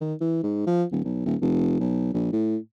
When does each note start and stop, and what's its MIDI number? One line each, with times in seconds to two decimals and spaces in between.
0.01 0.14 51
0.21 0.40 52
0.43 0.62 44
0.67 0.84 53
0.92 1.05 27
1.05 1.23 35
1.26 1.35 27
1.42 1.78 29
1.80 2.08 35
2.14 2.30 34
2.33 2.57 45